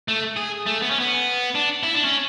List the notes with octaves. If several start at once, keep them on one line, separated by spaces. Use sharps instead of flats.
A3
G#4
A3
B3
C#4
B3
D4
E4
D4
C#4